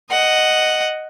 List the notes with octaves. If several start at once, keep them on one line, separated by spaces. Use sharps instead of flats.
D#5 F#5